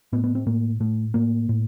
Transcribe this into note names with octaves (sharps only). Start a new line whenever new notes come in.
A2 B3
B3
C4
A2 A#3
A2 A3
A2 A#3
A2